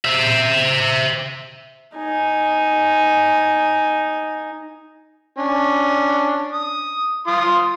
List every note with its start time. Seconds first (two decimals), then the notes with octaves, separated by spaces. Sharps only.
0.05 C5 E5
1.96 D#4 G#5
5.37 C#4 D4
6.52 D#6
7.27 F4 C6 D#6